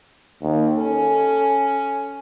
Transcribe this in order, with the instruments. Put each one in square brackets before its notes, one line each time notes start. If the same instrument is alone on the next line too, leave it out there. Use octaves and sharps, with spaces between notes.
[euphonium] D#2
[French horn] C#4 [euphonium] A4